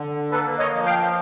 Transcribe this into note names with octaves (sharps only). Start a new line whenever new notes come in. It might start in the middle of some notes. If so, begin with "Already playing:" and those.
Already playing: D3
A#3 A4 B4
C#5 D#5
F3
F5 G5